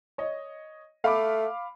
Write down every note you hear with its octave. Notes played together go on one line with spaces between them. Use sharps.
C#5 D#5
A3 F5 B5 D6